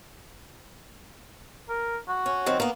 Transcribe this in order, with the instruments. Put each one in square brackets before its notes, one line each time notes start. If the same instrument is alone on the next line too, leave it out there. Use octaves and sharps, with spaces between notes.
[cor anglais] A#4
F#4
[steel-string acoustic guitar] C#4
D#3 F#3 C4
A#3 B3